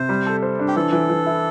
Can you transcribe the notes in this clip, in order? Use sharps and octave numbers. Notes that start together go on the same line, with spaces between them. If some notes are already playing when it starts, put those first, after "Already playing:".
Already playing: C3 C5
G3
A4
C5
D4
G4
E3 A4
E3
E3
E4